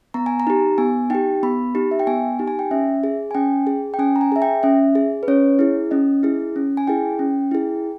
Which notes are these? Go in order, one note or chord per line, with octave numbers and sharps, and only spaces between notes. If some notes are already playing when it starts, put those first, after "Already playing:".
B3 A#5
G#5
A#5
D#4 G4
B3 G#5
D#4 G4 G5
B3 B5
D#4 G4
E5
G5
B3 G#5
D#4 G4
G#5
G5
C#4 E5
G#4
G#5
C#4 G5
G#4
G5
C#4 G#5
A#5
G#5
G#4 E5
G5
C#4 E5
G#4
B4
C#4 C#5
E4 G#4
C#4 D#5
E4 G#4
C#4
G#5
E4 G#4 G5
C#4
E4 G#4